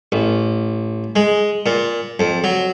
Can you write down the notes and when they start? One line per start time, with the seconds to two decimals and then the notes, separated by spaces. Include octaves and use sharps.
0.12 A1
1.16 G#3
1.66 A#2
2.20 F2
2.44 F#3